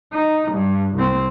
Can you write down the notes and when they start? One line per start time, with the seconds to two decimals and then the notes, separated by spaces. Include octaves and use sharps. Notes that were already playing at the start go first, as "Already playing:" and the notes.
0.13 D#4
0.51 G2
0.95 C2 C4